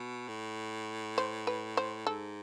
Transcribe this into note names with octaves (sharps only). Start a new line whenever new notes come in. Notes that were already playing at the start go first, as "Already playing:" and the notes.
Already playing: B2
A2
C5
B4
C5
G#2 A4